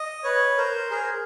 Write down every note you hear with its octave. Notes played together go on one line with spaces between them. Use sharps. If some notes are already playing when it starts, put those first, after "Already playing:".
Already playing: D#5
B4 C#5
A#4 C5
G#4 A#4